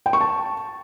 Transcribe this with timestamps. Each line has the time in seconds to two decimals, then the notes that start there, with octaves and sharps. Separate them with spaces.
0.06 G5
0.13 C#6
0.21 A5